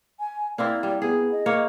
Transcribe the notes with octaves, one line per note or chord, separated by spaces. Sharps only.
G#5
A#3 C4 E4 D5
G3
B3 G#4
D#5
A#3 C#5